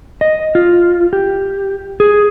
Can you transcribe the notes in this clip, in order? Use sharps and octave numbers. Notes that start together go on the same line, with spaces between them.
D#5
F4
G4
G#4